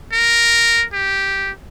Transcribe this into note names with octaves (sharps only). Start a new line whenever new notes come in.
A#4
G4